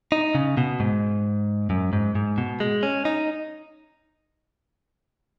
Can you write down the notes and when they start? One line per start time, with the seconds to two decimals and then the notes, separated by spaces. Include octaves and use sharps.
0.12 D#4
0.35 C#3
0.57 B2
0.80 G#2
1.70 F#2
1.93 G#2
2.15 G#2
2.38 B2
2.60 G#3
2.83 C#4
3.05 D#4